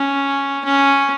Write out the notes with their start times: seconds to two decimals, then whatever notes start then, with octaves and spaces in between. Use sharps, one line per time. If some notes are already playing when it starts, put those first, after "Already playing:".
Already playing: C#4
0.65 C#4